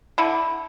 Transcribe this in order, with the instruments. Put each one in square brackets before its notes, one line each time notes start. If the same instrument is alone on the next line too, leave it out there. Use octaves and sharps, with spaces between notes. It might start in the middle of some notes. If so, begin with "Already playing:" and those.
[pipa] D3 E4